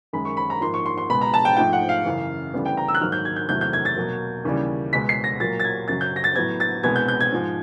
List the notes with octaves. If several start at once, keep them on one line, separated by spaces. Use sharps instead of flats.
F#2 D#3 G#3 B5
C#6
B5
A#5
G#2 F3 A#3 C6
C#6
C6
C6
C#2 B2 G#3 B3 B5
A#5
A5
G5
G#2 F3 A3 G5
F#5
F5
F#2 C#3 E3
D2 C#3 E3 G3 B3
G5
A#5
E6
F#6
G#2 D#3 F#3 A#3 F6
G6
G#6
G6
E2 C3 D#3 F#3 A3 G6
G6
G#6
A6
B2 F#3 A#3
D#2 C#3 E3 G3
C#2 B2 G#3 B3 B6
C7
A#6
A#2 F#3 A#3 A6
A6
G#6
F#2 C#3 F#3 A6
G6
A#6
A6
A2 F#3 B3 G#6
A6
C2 B2 G#3 B3 G#6
G6
G6
G#6
G#2 F3 G#3